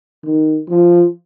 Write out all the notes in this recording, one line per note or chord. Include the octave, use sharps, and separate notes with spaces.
D#3
F3